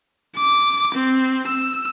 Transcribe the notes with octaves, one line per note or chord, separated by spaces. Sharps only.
D6
C4
E6